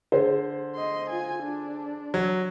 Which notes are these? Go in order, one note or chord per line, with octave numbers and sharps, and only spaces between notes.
D3 G#4 C5
D#5 C6
F4 G#5
D4
F#3